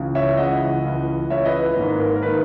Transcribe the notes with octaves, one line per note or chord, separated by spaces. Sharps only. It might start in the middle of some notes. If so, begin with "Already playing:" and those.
Already playing: C#2 C#3 E3
C#5 E5
C#2 C#3 E3 D#5 F#5
C#2 C#3 E3
C#2 C#3 E3 C#5 E5
B4 D#5
B4
G#1 G#2 D#3 A#3 B4
A#4
A#4
D#3 A#3 B4